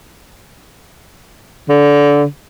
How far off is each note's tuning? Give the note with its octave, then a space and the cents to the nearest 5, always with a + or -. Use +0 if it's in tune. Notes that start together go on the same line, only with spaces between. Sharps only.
D3 -20